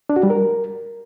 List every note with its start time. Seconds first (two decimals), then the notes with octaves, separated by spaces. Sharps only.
0.09 D4
0.16 F#4
0.23 G3
0.30 A#4